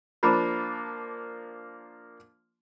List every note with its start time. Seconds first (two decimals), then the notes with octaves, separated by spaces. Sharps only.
0.23 F3 A#3 D4 C5 A#5 B5